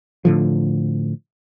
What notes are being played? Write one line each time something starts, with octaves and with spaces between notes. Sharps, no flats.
A2 D3 F3